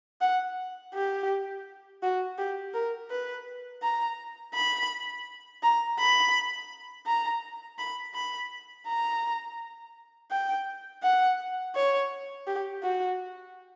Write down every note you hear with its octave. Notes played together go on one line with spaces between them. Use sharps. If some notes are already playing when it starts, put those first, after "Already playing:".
F#5
G4
F#4
G4
A#4
B4
A#5
B5
A#5
B5
A#5
B5
B5
A#5
G5
F#5
C#5
G4
F#4